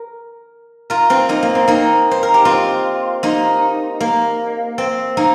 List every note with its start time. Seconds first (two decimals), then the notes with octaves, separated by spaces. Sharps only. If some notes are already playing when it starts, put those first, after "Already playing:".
Already playing: A#4
0.90 F4 A#4
1.10 C4 F4
1.29 A#3 D#4
1.43 A#3
1.55 C4
1.68 A#3 D#4
2.11 C5
2.23 A#4
2.34 G4
2.45 C4 F4
3.23 A#3 D#4
4.00 A#3
4.78 C4
5.17 A#3 D#4